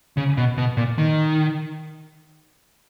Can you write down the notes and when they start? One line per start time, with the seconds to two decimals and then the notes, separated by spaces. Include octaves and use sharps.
0.17 C#3
0.37 B2
0.58 B2
0.77 A#2
0.98 D#3